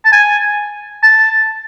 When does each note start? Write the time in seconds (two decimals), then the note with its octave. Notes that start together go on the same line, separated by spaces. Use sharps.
0.05 A5
0.13 G#5
1.03 A5